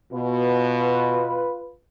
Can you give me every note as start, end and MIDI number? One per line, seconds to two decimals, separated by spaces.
0.13 1.46 47
0.13 1.77 65
0.13 1.77 71